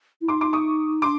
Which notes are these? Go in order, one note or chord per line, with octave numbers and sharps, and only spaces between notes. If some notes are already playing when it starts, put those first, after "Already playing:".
E4
D#4 C6 D6
C6 D6
C#6 D#6
D4 C6 D6